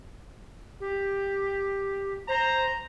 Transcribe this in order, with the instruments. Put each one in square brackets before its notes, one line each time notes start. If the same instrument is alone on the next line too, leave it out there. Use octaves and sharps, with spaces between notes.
[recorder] G4
[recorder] C5 [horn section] A#5